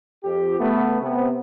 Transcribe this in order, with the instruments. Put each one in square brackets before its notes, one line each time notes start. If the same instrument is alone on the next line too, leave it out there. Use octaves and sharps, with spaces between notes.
[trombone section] F2 G4
C#3 A3 B3
C3 B3